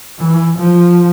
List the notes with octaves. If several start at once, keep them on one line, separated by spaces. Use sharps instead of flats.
E3
F3